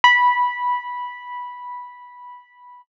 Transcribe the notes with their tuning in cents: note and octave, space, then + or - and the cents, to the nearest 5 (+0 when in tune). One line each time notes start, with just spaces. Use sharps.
B5 -10